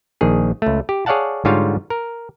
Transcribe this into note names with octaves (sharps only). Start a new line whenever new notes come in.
A#1 D#3 G#4
C#2 A3
G4
G#4 C#5 D5 F5 F#5 A5
G#2 D3 G3 F4 C#5 F5
A#4